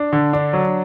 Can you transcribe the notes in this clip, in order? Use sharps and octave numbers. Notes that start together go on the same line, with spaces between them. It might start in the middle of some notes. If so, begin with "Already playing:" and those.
Already playing: D4
D3
D4
F#3